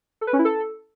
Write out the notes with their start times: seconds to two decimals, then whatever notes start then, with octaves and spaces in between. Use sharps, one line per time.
0.21 A4
0.27 B4
0.33 C#4
0.39 E4
0.45 A4